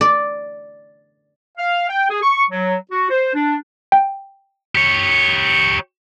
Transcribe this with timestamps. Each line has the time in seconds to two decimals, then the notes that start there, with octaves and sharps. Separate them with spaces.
0.01 D5
1.57 F5
1.89 G5
2.10 G#4
2.23 C#6
2.51 F#3
2.91 F#4
3.10 C5
3.34 D4
3.92 G5
4.75 G4 C#5